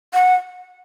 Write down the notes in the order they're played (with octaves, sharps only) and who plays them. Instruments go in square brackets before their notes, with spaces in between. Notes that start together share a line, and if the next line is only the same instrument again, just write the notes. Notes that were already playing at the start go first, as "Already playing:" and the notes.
[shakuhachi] F#5